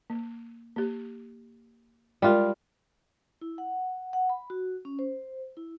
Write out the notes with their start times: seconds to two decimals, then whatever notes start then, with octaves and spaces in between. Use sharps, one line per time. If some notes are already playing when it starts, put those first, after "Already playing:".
0.10 A#3
0.76 A#3 G4
2.22 G3 G#3 F4 G4 A#4
3.41 E4
3.58 F#5
4.13 F#5
4.30 B5
4.50 F#4
4.85 C#4
4.99 C5
5.57 E4